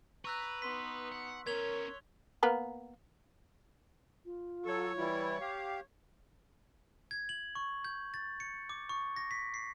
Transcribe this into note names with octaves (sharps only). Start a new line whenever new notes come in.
B4 A#5 C#6 E6 F#6
B3 D#4 C6 B6
F#5
B3 C#4 A#4 C#5 G#6 F7 G7
A#3 B3 A#4
F4
F#3 A4 C#5
E3 G3 E4
G4 F5 G5
G#6
F#7
C#6
G6
A6
C#7
D6
C#6
A#6
B6
C7